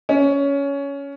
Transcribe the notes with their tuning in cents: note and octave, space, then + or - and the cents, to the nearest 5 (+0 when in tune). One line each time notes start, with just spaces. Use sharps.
C#4 +15